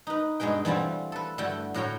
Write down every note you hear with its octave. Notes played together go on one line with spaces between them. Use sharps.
D#4 B4
G2 B2 G#3 B4 G5
E3 G3 A3 C4 F4 F#4
A4 B4
G2 D3 A3 E4 F#4 G5
A2 F#4 C#5 G5 A#5